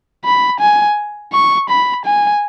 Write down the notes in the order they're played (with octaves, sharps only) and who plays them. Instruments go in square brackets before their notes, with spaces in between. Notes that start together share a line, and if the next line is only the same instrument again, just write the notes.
[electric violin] B5
G#5
C#6
B5
G#5